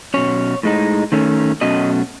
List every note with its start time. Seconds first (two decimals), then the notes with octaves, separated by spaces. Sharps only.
0.14 B2 F#3 C#4 C#5
0.63 A2 G#3 D#4
1.12 D#3 A3 C#4
1.61 B2 F#3 A3 C#4 D#5